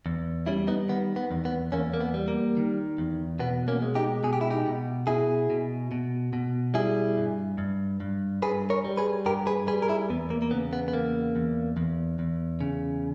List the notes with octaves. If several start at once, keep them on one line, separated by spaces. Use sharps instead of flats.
E2
G3 C#4 E4
B3 D#4
D#3 B3
B3
E2
B3
E2 A#3 C#4
A#3
B3
G3
A#3
D#3
E2
B2 B3
A#3 C#4
G#3
D#4 G4
B2 G#4
G4
E4
D#4 G4
B2
B2 E4 G#4
B2
B2
B2
G3 E4 G#4
G2
G2
G2
G2 G#4 B4
A#4 C#5
G3
G#4 B4
G2 G4 A#4
G#4 B4
G3 G#4 B4
A#4
E4 G#4
E2 B3
A#3
A#3
C#3 B3
B3
B3
E2 A#3
E2
E2
E2
C#3